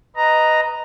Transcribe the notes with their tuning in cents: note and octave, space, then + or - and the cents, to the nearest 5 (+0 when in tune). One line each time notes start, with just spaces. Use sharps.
B4 +5 D#5 +0 A#5 +0